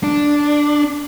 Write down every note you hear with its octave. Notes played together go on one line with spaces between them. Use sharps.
D4